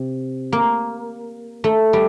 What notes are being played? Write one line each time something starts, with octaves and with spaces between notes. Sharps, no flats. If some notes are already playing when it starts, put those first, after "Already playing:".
Already playing: C3
A#3
A3
G3